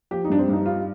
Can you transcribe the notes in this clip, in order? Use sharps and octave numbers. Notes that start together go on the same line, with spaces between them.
F3 G4
D#4
G2 D4
C4
G2 D#4
G3 F4